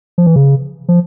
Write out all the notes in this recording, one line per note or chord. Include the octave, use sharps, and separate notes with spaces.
F3
E3
C#3
F3